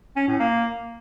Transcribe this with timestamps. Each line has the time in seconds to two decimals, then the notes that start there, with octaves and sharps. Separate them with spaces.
0.16 C#4
0.28 A2
0.40 A#3